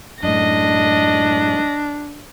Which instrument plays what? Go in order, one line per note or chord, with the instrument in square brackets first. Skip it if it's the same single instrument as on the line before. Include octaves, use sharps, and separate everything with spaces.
[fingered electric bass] F#2 A2 [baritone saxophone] D4 [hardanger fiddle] D#5 [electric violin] A#6